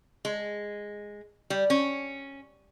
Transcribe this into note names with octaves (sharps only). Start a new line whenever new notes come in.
G#3
G3
C#4